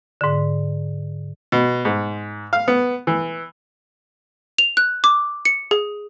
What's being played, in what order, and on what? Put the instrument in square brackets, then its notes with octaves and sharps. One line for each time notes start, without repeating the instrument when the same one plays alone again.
[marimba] G#2 D3
[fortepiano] B2
G#2
F5
B3
E3
[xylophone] F7
F#6
D6
C#7
G#4